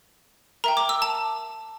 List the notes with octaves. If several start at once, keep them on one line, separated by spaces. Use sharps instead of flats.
A#4 E5 G5 A#5
D6
E6
A5